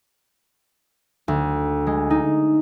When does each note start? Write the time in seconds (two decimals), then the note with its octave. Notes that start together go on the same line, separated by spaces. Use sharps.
1.28 D2
1.87 G#3
2.10 D#4